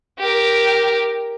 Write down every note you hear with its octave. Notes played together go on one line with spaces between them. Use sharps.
G4 A#4